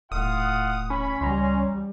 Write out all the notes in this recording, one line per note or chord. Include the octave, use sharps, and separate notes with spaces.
D#1 A2 F4 F5 F#5 D#6
C#4 B5
C#2 G3 G#5 A#5 C6